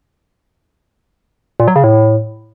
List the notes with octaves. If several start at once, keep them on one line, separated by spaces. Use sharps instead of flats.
A#2
F#3
C#3
A2